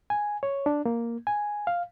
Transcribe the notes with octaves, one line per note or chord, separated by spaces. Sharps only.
G#5
C#5
D4
A#3
G#5
F5